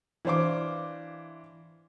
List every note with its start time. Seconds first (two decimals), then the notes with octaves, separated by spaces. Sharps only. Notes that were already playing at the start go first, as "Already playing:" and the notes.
0.25 E3 D4 C5 F5 D6